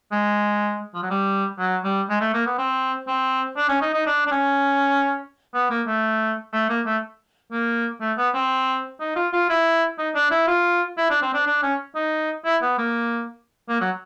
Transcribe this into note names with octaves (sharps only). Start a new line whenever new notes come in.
G#3
F3
F#3
G3
F#3
G3
G#3
A3
A#3
B3
C4
C4
D4
C#4
D#4
D#4
D4
D4
C#4
B3
A#3
A3
A3
A#3
A3
A#3
A3
B3
C4
D#4
F4
F4
E4
D#4
D4
E4
F4
E4
D4
C4
D4
D4
C#4
D#4
E4
B3
A#3
A#3
F#3